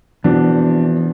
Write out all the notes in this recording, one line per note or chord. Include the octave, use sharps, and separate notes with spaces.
F2 B2 E3 B3 D4